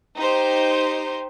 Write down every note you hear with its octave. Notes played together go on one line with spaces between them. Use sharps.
D#4 G4 C5